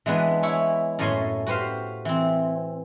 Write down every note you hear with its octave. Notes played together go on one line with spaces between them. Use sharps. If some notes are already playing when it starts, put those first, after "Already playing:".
E3 G#3 B3 D4 B4
E4 C#5
F#2 A2 A3 C#4 G#5 C6
F#4 G4 B4 C5 F5
E3 C4